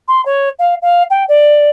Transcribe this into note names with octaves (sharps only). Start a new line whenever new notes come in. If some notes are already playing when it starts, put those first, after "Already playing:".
C6
C#5
F5
F5
G5
D5